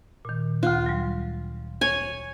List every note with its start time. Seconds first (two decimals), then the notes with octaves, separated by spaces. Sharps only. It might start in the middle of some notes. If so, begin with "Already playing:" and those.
0.25 A#2 D#3
0.63 D2 F4 F#5 F#6
0.86 F#3 G3
1.81 C#5 G#5